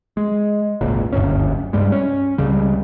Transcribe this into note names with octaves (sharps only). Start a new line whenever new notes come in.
G#3
G#1 C#2 A#2 C#3
F#1 D2 G2 C#4
C2 G2 G3 G#3
C#4
C#2 C#3 G3